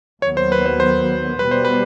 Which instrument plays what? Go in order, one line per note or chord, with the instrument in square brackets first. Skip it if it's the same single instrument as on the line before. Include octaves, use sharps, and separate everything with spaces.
[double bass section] D#2 D#3 F#3 B3 [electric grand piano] C#5
[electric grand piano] C5
B4
C5
C5
[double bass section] B2 G3 B3 [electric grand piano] B4
[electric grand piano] C5
B4